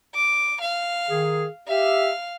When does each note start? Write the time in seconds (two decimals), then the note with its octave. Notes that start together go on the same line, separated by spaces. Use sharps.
0.15 D6
0.61 F5
1.10 D#3 G#4
1.68 G4 E5 F5